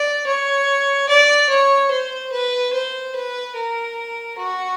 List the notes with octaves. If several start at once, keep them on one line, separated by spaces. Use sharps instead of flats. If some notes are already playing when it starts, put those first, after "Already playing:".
Already playing: D5
C#5
D5
C#5
C5
B4
C5
B4
A#4
F#4